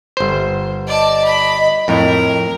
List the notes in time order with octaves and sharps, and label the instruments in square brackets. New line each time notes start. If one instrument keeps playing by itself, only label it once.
[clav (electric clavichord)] G1 C5
[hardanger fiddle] D5 A5 [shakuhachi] D#5
[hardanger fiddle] B5
[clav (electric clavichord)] F2 A2 [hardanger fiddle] A#4